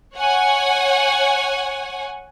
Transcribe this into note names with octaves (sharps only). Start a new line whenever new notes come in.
C#5 F#5 G#5